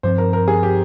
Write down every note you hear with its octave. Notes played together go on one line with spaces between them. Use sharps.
G2 F3 C4 C5
A#4
A#4
G#4
G4